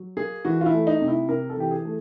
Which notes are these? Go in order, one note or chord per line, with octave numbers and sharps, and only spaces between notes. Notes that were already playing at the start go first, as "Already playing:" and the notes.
Already playing: F#3
A#3 G#4
E3 F#4
F4
E4
A3
D#4
C3
E4
C3 A#4
A4
E3 G4
G#4
A3